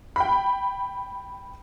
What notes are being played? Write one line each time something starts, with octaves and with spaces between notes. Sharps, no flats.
G5 B5